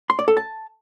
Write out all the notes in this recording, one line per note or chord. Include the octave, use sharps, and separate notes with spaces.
C6
D5
A4
A5